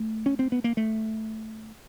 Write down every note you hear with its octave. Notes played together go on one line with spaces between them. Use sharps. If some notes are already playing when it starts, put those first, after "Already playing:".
Already playing: A3
C#4
C4
B3
A#3
A3